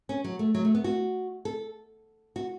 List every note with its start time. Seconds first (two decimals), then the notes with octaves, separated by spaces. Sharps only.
0.09 C#4
0.24 F#3
0.39 A3
0.55 F#3
0.65 A3
0.75 B3
0.84 F#4
1.45 A4
2.36 F#4